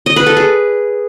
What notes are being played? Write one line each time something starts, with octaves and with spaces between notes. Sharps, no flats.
D#5
B4
A4
G#4